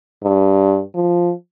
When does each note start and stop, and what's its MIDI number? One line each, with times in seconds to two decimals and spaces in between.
0.23 0.81 43
0.95 1.33 53